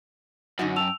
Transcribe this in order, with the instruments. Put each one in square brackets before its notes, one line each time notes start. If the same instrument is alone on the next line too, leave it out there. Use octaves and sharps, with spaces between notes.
[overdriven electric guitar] F#2 [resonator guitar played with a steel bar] D3 D#4 F#4
[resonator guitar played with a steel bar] G5 A5 [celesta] E6 F7